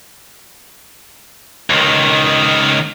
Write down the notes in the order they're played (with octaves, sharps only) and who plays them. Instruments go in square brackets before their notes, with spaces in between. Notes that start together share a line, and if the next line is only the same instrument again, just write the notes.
[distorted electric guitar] C#2 D#3